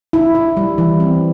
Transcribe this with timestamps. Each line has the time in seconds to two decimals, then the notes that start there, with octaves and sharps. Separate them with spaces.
0.13 E4
0.35 E4
0.57 G3
0.78 E3
1.00 C4